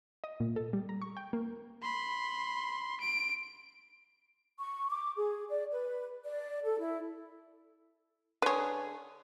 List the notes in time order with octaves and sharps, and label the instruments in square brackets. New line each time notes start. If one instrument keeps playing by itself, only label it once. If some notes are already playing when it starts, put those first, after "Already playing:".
[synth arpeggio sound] D#5
A#2
A4
G3
A#5
C#6
G5
A#3
[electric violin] B5 C6
D7
[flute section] C#6
D6
G#4
D5
B4
D5
A4
E4
[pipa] D3 G#4 [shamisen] B4 C#5